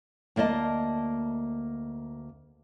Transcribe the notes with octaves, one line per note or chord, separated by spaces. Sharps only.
D2 A#3 D5 D#5 A5